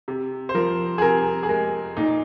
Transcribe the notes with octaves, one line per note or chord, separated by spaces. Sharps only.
C3
C5
F3 A#4
G#4
C3 A#4
G#4
G#3 A#4
A#2 D#4